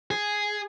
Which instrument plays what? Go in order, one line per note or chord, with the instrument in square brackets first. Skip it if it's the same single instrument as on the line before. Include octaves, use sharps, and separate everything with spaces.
[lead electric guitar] G#4